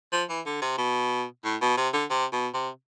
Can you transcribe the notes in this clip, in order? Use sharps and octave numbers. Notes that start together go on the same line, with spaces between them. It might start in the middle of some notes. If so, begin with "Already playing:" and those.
F3
E3
D3
C3
B2
A2
B2
C3
D3
C3
B2
C3